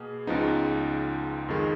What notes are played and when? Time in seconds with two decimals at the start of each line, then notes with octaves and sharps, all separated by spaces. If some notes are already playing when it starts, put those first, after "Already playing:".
Already playing: B2 A#3 G#4
0.27 C#2 C#3 F3 B3 D#4
1.48 F2 D#3 G#3